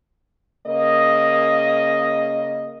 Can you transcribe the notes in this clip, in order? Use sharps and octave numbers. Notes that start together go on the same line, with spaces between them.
C#3 A#3 D#5